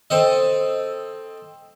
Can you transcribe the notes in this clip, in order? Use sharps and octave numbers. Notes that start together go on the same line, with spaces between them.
C4 A4 D#5